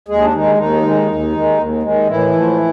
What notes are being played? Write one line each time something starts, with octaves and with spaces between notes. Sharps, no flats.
D#2 G#3 G#4
D4
D#3 G#3 D#4
D#2 D#3 D#4
D#3 G#3
D#2
D#3 G#3
D#2
D#3 G#3
A2 E3 E4
F3 A3